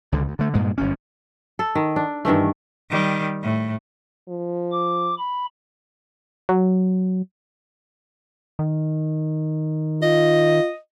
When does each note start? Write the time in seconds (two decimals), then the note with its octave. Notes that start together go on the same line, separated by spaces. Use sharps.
0.12 C#2 D3
0.28 D2
0.39 D3 A3
0.54 G2 A#2 G#3
0.78 G1 F#2 C#4
1.59 A4
1.75 D#3
1.96 D4
2.25 G2 D#3 E3 A3
2.90 D#3 G3
3.43 A2
4.28 F3
4.72 D6
5.18 B5
6.49 F#3
8.59 D#3
10.03 F4 D#5